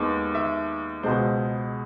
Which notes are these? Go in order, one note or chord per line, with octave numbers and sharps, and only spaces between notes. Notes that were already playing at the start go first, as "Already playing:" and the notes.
Already playing: D#2 D#3 G#3 B3
E5
C#2 B2 G#3 C5